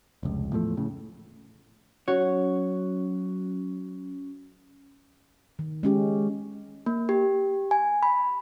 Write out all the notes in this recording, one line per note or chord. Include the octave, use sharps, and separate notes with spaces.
F1 C#2
E2 A2 F3 A3
A2 C#3
F#3 C#4 F#4 C#5
D#3
G#3 C#4 G4
A#3
G4
G#5
B5